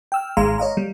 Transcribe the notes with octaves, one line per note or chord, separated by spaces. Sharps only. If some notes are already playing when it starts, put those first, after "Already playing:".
G5 E6 F6
G#1 G#2 G#3 F5 A#5 C6
C#5 D#5 F5 A#5
G3